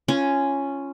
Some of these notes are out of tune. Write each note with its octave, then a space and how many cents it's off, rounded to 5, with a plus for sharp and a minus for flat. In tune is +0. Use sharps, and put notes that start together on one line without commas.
C#4 +0 F4 -20